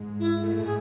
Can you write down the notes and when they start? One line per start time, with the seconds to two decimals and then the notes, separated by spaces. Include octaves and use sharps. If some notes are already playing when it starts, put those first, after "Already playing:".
Already playing: G#2 G#3
0.19 E4
0.43 A3
0.51 G#3
0.59 A2 A3
0.64 G#4